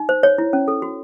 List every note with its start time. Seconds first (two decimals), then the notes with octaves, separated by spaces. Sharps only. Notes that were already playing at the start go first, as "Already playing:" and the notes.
Already playing: D#4
0.09 C5
0.23 C#5
0.38 E4
0.53 C#4
0.68 A4
0.82 F#4